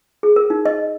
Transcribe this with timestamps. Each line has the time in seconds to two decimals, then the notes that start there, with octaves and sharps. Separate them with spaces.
0.23 G#4
0.36 A#4
0.50 D#4
0.66 D#5